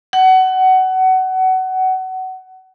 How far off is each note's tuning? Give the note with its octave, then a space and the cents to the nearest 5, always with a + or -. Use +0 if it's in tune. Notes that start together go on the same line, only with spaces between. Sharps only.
F#5 +25